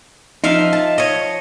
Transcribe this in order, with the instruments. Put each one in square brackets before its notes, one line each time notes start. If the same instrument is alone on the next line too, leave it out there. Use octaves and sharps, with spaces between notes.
[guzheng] F3 E5 F5 [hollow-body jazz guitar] D#4
[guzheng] A5
C#5 D#5